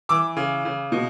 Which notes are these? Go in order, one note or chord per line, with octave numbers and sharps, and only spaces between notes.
E3 D6 E6
C#3
C#3
B2